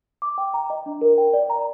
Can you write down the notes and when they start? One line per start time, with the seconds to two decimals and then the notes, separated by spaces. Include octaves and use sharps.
0.22 D6
0.38 G5
0.54 A#5
0.70 D#5
0.86 D4
1.01 A#4
1.18 G5
1.33 D5
1.50 A#5